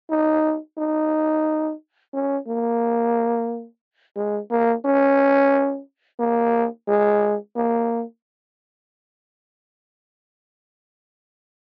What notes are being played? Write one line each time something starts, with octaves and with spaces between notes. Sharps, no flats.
D#4
D#4
C#4
A#3
G#3
A#3
C#4
A#3
G#3
A#3